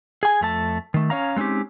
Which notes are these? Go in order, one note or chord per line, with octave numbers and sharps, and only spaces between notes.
G#4 G#5
F2 A3 A5
D#3 A3
C#4 C#5 F5 A#5
G#3 C4 C#4 D#4 G4